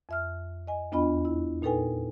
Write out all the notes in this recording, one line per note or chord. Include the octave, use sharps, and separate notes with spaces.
F2 E5 F6
D#5 G#5
E2 B3 D4 F4 D#5 B5
E4
A#2 D#4 A4 B4 G5 G#5